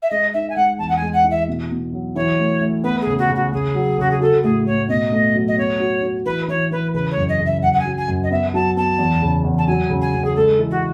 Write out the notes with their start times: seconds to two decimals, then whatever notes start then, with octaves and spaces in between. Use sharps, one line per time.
0.02 E5
0.11 G#3 D#5
0.33 D#4 E5
0.50 G#5
0.56 G#3 F#5
0.79 E2 A5
0.89 F#5
0.96 G#5
1.02 G#3
1.13 F#5
1.24 E3
1.31 E5
1.48 B2
1.71 B2
1.93 F#3
2.15 E3 C#5
2.39 A3
2.61 A3
2.84 B3 B4
3.01 G#4
3.07 C#3
3.18 F#4
3.30 C#3
3.35 F#4
3.52 C#3 G#4
3.75 F#3
3.98 C#3 F#4
4.11 G#4
4.21 F#4 A4
4.43 A2 G#4
4.66 A2 C#5
4.89 B2 D#5
5.12 A3
5.35 F#3
5.48 D#5
5.58 B3 C#5
5.80 F#4
6.03 F#4
6.25 E3 B4
6.48 E3 C#5
6.71 E3 B4
6.94 C#3 B4
7.11 C#5
7.17 F#2
7.29 D#5
7.40 C#3
7.46 E5
7.62 F#2 F#5
7.73 F#5
7.79 G#5
7.86 F#3
7.97 G#5
8.08 F#2
8.23 D#5
8.31 B3 E5
8.54 F#3 A5
8.76 B3 A5
8.99 E2
9.22 C#3
9.44 E2
9.58 A5
9.67 F#3 G#5
9.90 C#3
10.01 G#5
10.14 C#3
10.24 G#4
10.36 G#3 A4
10.58 E3
10.71 F#4